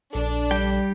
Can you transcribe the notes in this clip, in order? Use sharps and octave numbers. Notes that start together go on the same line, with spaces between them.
A#1 D4 A4
G3 G4 G5